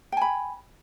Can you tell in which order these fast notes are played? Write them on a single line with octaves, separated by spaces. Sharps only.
G5 G#5 B5